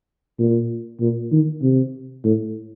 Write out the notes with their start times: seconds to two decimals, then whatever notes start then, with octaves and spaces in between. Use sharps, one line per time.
0.39 A#2
1.00 A#2
1.32 D#3
1.62 C3
2.24 A2